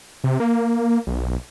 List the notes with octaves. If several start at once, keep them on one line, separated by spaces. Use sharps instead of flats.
C3
A#3
B1